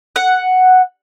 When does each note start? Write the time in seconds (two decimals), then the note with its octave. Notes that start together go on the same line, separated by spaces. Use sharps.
0.16 F#5